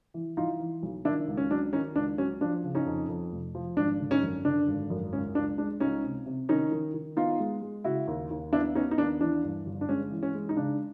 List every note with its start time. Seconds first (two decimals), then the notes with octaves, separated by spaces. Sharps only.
0.14 E3
0.37 E3 D#4 F4
0.59 E3
0.83 B1
1.05 D#3 D4 E4
1.28 C#2
1.37 C#4
1.50 F#3 D4
1.73 D#3 C#4 D#4
1.95 C#2 D4
2.18 F#3 C#4
2.41 F3 D4
2.63 C#3
2.75 C#4 D#4
2.86 F2
3.09 F2
3.32 F1
3.55 F3
3.77 G#1 D4
4.00 D3
4.11 C#4 D#4
4.22 F#2
4.45 D3 D4
4.68 G#1
4.90 F#2
5.13 C#2 C#4
5.35 C#2 D4
5.58 G#3 D4
5.80 C#2 C#4 D#4
6.03 C3
6.26 C3
6.49 D#3 C#4 D#4
6.72 D#3
6.94 D#3
7.17 B3 D#4 F4
7.40 G#3
7.62 G#3
7.84 C#3 E4 F#4
8.08 D#2
8.31 D#2
8.53 B3 D4 E4
8.75 B3 C#4 D#4
8.91 D#4
8.98 D#2 D4
9.20 E3 D4
9.44 G2
9.66 G1
9.81 D4
9.89 G#3 C#4
10.11 E3
10.23 C#4
10.34 G#3
10.49 D#4
10.56 C#3 D4